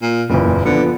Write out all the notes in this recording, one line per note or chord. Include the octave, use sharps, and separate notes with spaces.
A#2
F#1 E2 A#2
D3 F3 B3